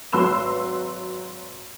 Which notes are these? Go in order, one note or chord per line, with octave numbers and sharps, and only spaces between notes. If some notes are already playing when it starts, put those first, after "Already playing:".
G#1 F#3 B4 C6 E6 E7